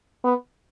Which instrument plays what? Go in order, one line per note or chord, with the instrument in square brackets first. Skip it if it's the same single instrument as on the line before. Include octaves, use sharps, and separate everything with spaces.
[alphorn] B3